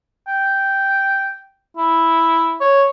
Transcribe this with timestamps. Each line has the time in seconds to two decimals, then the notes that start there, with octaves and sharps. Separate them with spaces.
0.28 G5
1.77 E4
2.61 C#5